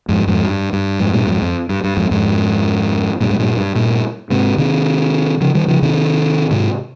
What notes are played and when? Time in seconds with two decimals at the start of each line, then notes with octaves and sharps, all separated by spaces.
0.08 F2 G#2
0.27 F2 G#2
0.45 G2
0.73 G2
1.00 F2 G#2
1.14 G2 A#2
1.27 F2 G#2
1.42 F2
1.69 G2
1.84 G2
1.97 F2 G#2
2.11 F2 G#2
3.20 G2 A#2
3.30 G#2
3.39 G2 A#2
3.57 G2
3.76 G2 A#2
4.30 G#2 C3
4.58 C3 D#3
5.41 C#3 F3
5.55 D#3 G3
5.68 C#3 F3
5.82 C3 D#3
6.51 G#2 C3